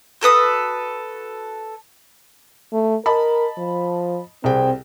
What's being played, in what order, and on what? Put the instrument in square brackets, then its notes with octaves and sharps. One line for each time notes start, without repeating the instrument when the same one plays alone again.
[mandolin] F#4 A4 B4 D#6
[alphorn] A3
[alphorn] A#4 [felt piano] D#5 A5 B5
[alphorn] F3
[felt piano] C2 G#4 G5 [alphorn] C4